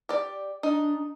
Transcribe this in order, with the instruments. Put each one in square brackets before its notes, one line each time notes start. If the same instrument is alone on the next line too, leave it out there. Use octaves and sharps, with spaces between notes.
[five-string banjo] G4 D5
[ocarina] D4 [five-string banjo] D#4